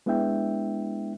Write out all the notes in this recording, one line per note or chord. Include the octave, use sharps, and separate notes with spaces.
G#3 B3 D4 E4 E5 G5